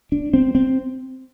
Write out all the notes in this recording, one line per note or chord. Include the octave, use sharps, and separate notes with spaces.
D4
C4
C4